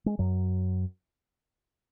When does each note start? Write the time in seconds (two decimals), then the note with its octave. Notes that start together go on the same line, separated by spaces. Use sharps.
0.06 G#3
0.19 F#2 F#3